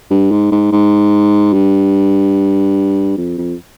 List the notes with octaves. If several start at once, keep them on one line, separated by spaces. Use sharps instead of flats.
G2
G#2
G#2
G#2
G2
F2
F2